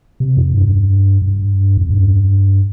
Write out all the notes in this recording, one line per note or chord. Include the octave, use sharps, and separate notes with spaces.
C3
F2
G2
G2
F2
G2